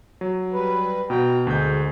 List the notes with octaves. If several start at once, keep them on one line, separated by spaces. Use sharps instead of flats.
F#3
G3 B4
B2 F#4 G5 A#5
D2 G#3 G6